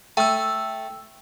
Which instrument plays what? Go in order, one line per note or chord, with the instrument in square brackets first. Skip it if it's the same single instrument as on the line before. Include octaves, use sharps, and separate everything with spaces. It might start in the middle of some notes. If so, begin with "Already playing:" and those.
[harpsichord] A3 [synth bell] G5 E6